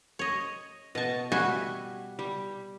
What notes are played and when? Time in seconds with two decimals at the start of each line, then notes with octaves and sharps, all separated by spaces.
0.19 C#5 D#5
0.95 B2 D#5 A5 C#6
1.32 G3 F#4 E5 G#5
2.19 G3